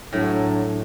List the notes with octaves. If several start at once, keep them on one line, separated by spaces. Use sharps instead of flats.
A2 F#3 D4